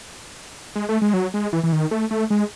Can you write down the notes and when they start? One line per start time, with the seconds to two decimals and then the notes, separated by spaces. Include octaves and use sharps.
0.76 G#3
0.89 A3
1.02 G#3
1.14 F#3
1.34 G#3
1.53 E3
1.63 E3
1.72 D#3
1.91 A3
2.11 A3
2.30 G#3